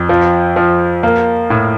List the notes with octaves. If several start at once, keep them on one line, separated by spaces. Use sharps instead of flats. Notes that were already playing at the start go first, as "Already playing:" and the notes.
Already playing: F2
F3
F3
A#3
A2